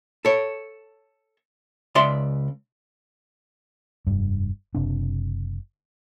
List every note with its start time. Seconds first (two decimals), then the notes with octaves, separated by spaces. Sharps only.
0.25 A4 C#5
1.95 C#2 D5 E5 C6
4.07 F1 G2
4.75 F#1 C3 D4